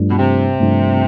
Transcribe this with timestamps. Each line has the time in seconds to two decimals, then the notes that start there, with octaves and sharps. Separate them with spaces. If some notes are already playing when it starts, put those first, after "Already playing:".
Already playing: G2 F3 A3 D4
0.10 B2
0.18 C3
0.60 G2 F3 A3 D4